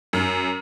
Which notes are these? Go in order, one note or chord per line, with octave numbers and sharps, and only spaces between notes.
F#2